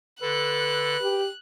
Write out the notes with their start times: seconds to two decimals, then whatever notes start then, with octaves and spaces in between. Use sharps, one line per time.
0.22 D3 A4 B4 F#6
1.02 G4